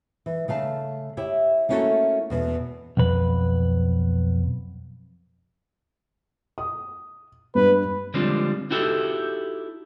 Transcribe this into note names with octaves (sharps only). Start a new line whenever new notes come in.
E3
C#3 A3 F5 A5
E4 G4 C#5 E5
A3 A#3 C#4 E4 F#4 A4
E2 B2 B3
B1 F2 B4
D#6
G2 B4
D3 F3 G3 G#3 C4 D4
D#4 E4 F#4 G4 A4 E5